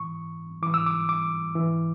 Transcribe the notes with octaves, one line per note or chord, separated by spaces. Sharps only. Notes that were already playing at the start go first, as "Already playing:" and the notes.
Already playing: G#2 E3 C#6
G#2 E3 D6
E6
D6
D6
G#2 E3